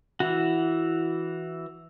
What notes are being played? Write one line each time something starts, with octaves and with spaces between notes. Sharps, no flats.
E3 E4 F#4